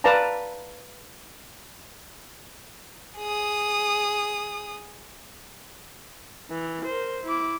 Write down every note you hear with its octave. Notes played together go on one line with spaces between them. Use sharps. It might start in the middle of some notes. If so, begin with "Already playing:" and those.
B4 D5 F5 A5 A#5
G#4 D#6
E3
A#4 C5
E4 D6